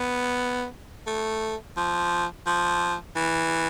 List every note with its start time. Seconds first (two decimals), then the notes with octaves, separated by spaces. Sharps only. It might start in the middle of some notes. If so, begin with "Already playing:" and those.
Already playing: B3
1.07 A3
1.77 F3
2.47 F3
3.16 E3